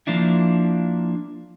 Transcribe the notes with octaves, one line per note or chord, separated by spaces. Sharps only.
F3 A#3 D4 E4